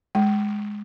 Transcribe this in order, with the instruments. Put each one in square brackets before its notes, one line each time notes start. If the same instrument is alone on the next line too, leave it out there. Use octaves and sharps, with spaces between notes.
[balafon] G#3